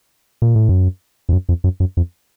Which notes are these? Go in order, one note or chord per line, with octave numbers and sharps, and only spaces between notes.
A#2
A2
F#2
F2
F#2
F2
F#2
F#2
F2